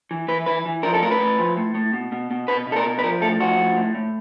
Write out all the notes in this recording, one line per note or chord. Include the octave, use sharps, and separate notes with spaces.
E3
E3 B4
E3 B4
E3
F3 A#4
A4
A2 A#4
B4
A2
F3
A2
A2
B2
B2
B2
B2 B4
B2
A4
A#4
B2
B4
F3 A#4
A2 A4
F3 F#4
A2
A2
A2